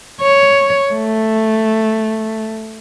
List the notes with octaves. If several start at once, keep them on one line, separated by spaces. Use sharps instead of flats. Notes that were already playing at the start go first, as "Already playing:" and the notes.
C#5
A3